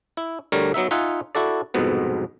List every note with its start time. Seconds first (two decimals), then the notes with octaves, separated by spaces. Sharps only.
0.17 E4
0.52 D2 D3 G3 A#4 C#5
0.74 F#3 B3 D#4 E5
0.91 D#4 F4 E5 F#5 G#5
1.35 E4 F#4 A4 D5
1.74 C2 F2 G#2 B2 B3